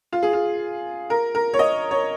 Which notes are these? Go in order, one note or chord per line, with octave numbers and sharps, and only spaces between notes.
F4
G#4
F4
A#4
A#4
C#5
D#5
C#5